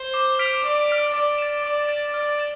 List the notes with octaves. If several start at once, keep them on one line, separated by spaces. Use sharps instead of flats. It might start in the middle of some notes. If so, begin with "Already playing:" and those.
Already playing: C5
D6
F6 B6 D7 F7
D5 D6
F6 B6 D7 F7
D5 D6
A6 E7
D5 D6
A6 E7
D5 F6
A6 E7